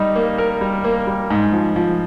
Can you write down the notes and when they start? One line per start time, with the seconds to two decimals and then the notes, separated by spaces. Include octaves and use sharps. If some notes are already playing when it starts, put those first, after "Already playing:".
Already playing: G3 D#4
0.15 A#3
0.38 A#4
0.61 G3
0.84 A#3
1.07 G3
1.30 G#2
1.52 F3
1.76 F3